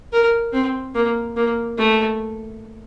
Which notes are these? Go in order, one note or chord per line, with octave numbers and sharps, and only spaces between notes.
A#4
C4
A#3
A#3
A3